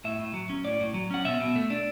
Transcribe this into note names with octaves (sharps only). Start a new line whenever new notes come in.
A2 E5
A2
F#3
C#4
A2 D5
A2
F#3
C#4 F#5
B2 E5
B2
A3
D4